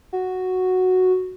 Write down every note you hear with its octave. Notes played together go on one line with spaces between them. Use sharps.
F#4